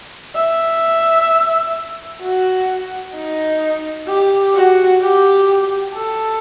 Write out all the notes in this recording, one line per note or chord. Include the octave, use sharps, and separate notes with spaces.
E5
F#4
D#4
G4
F#4
G4
A4